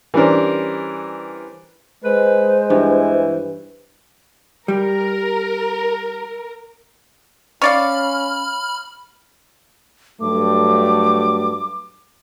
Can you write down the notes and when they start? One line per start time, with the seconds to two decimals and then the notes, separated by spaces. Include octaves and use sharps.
0.14 E3 G3 C#4 D4 A#4 C5
2.04 G#3 B4 C5
2.70 G2 E3
4.68 G3 A#4
7.62 C#4 C#5 D5 F5 B5 F6
10.21 G2 F#3 A3 D6